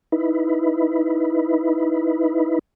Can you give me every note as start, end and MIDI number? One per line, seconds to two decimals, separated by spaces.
0.12 2.59 63
0.12 2.59 64
0.12 2.59 71